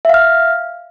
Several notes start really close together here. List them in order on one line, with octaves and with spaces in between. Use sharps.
E5 F5 F6